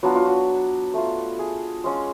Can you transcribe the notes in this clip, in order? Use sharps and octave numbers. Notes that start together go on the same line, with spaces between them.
F#3 B3 D4 F4 F#4
F4
F#4
A3 F4
G#4
G#3 C#4 F4